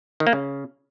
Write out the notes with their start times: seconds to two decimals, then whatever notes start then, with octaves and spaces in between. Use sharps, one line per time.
0.20 D#3
0.27 A#3
0.33 C#3